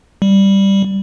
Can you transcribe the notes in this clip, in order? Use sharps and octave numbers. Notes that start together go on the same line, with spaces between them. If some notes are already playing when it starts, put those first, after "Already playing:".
G3